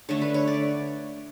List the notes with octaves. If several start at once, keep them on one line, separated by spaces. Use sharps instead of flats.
D3 A3 C#5
B4
C#5
D5